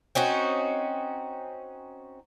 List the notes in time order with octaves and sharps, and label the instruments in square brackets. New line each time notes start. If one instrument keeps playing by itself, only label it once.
[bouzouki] C4 C#4 D#4 F#4